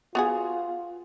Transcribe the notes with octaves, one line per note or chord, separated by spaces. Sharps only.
B3 F4 F#4 G#4